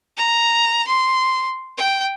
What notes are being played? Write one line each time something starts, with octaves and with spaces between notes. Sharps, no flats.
A#5
C6
G5